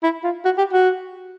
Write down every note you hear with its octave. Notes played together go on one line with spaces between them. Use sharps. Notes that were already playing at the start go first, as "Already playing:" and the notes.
E4
F4
F#4
G4
F#4